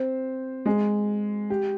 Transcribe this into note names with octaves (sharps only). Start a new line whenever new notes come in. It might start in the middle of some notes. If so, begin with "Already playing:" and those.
Already playing: C4 C5
G#3 G#4
G4